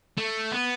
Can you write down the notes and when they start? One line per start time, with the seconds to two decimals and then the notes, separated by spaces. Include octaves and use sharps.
0.18 A3
0.52 B3